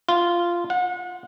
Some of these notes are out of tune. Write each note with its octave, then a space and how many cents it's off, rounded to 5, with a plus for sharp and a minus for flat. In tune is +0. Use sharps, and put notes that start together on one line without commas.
F4 -10
F#5 -35